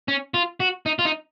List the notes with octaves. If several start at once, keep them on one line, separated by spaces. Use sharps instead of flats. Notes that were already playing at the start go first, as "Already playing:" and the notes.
C#4
F4
F#4
D#4
F4
D#4